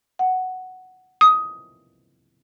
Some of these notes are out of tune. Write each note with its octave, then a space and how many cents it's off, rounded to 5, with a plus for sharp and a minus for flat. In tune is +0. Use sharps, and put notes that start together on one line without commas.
F#5 +5
D#6 +15